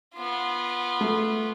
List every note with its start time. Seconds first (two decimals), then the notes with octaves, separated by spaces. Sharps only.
0.15 B3 F4
1.01 A3